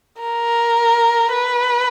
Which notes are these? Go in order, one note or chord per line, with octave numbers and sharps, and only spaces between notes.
A#4
B4